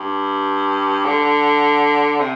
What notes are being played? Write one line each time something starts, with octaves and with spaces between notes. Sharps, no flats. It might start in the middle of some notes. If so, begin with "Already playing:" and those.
Already playing: G2
D3
C3